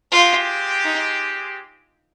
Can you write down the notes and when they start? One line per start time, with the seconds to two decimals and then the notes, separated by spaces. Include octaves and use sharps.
0.12 G#3 C4 F4 G4
0.85 D#4